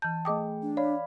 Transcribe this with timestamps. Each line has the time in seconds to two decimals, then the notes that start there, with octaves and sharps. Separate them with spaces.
0.02 E3 A5 G6
0.25 A3 G#4 D#5 G5 D6 D#6
0.62 D4
0.77 C#5 D5 F5 B5